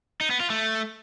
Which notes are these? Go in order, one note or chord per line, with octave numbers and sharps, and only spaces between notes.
D#4
B3
F4
A3